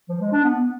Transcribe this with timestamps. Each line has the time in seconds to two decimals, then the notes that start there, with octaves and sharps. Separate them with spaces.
0.09 F3
0.21 G#3
0.32 D4
0.44 B3